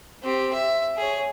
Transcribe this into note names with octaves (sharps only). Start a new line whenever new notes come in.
C4 G4
E5
G#4 C#5